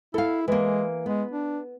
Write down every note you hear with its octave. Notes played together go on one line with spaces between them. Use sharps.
E4 A4 F5
E3 G#3 A#3
G#3 B3
D4